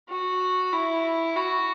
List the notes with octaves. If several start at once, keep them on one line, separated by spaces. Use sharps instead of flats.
F#4
E4
F#4